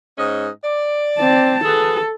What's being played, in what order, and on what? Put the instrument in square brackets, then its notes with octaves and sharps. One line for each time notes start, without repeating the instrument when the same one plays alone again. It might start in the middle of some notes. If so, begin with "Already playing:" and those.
[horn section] G#2 C#4 D#5
D5
[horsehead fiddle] C4 A5
[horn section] F#4 G#4 B4 [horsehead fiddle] A4